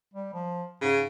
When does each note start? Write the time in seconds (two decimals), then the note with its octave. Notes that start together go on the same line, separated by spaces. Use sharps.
0.14 G3
0.34 F3
0.81 G#2 C#3